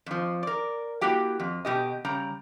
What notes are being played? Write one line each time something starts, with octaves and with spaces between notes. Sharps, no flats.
F2 F3
A#4 D5
A#3 E4 F#4 G4 G5
F2
B2 G4 D#5
C#3 G3 A#5